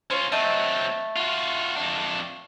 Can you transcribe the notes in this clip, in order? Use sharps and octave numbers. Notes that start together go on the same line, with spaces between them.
C#4 F4 C5 C#5
F#3 A3 C4 D#5
F4 F#4
F2 D4